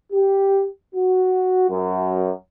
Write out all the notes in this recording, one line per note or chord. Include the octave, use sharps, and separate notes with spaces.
G4
F#4
F#2